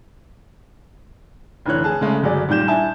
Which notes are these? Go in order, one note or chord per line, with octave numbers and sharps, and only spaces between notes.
F1 D3 E3 C#5 F#6
G#4 A5
C#3 G#3 A3
G1 F#3 G#4 D5
A#2 D#3 G3 G6 E7
D4 E4 E5 G#5 A5